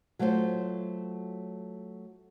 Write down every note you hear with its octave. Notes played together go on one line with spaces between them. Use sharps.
F#3 A3 F4 F#4 C5